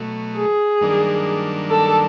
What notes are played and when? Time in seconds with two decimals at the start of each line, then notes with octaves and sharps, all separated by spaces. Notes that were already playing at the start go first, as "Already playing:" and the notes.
Already playing: B2 F#3 A3
0.36 G#4
0.81 G2 D#3 F#3 A#3 D4
1.70 A4